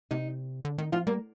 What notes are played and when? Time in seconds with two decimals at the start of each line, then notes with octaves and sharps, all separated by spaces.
0.11 C3 D#4
0.65 D3
0.78 D#3 D#4
0.92 F3 F4
1.07 G3 A#3